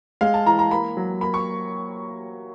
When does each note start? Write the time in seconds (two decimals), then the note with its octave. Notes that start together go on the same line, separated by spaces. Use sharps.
0.21 G#3 F5
0.34 A5
0.46 E3 A#5
0.59 A#5
0.71 A#3 B5
0.97 F#3
1.21 A#3 B5
1.34 C#6